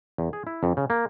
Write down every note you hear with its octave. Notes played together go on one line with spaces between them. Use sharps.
E2
G#4
E4
F2
C#3
A#3